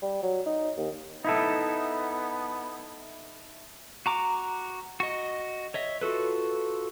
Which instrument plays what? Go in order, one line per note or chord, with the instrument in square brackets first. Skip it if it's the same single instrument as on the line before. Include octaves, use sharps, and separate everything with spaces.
[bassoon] G3
F#3
D#4
D#2
[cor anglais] B3 [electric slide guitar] D#4 E4 A4
[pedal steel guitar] F#4 A#5 D6
F#4 D#5
C#5 D#5 E5
F4 F#4 A4 B4